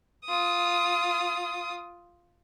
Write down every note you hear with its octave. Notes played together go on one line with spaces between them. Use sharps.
F4 D#6